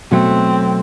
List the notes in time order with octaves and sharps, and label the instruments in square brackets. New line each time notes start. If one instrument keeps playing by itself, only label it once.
[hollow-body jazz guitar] B2 F#3 A3 [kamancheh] C4